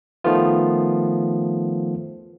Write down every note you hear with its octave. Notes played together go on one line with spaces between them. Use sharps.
D#3 F3 A3 B3 F4